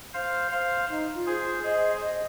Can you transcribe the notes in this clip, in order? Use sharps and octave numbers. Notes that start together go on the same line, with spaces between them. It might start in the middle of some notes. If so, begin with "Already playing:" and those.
C5 F5
C5 F5
D#4
F4
G#4 C5
G#4 C5 D#5
D#5